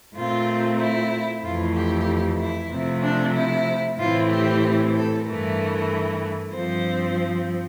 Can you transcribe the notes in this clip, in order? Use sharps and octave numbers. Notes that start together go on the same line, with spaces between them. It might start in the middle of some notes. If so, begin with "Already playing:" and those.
A#2 A3 C4 F4
E4
F2 E3 A3 F4
G4
E4
C3 F3 A3 C4
D4
E4
A2 E3 A3 C4 F4
G4
A4
G2 E3 A3 A#4
G2 F3 C4 C5